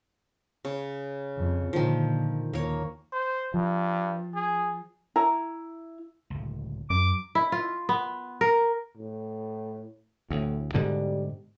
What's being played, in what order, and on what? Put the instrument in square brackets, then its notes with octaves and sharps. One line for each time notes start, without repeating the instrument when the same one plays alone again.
[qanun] C#3
[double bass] F2
[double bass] A#2 D3 [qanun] D#3 F3
[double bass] D#2 [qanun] A#3 C#5
[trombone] C5
[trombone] G2 [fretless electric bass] F3
[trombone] G#4
[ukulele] E4 A#5
[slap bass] D1 C#2
[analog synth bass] F#2 [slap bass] F#3 [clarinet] D6
[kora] E4
F4
B3
A#4
[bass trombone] A2
[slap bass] D2 [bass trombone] A2
[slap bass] G#2 B2 D3 [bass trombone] G3